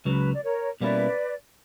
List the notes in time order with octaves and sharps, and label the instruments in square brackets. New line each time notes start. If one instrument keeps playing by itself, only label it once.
[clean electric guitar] C#2 C#3 F#3 [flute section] B4
[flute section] D5
A#4 C#5
[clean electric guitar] B2 G3 A#3 C#4 E4 [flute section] B4 D5